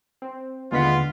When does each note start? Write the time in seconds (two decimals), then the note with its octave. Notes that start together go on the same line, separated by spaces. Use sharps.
0.22 C4
0.72 D#2 D3 G#3 B3 F4 F#5 B6